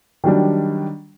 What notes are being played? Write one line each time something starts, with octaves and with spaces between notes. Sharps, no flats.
D#3 F#3 G3 D4